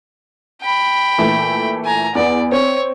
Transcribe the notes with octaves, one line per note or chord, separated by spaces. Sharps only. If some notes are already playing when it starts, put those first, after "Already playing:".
G5 B5
A#2 E3 A3
G#5 A#5
E2 B3 D5
C4 C#5